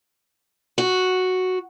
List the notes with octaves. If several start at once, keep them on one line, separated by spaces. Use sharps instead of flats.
F#4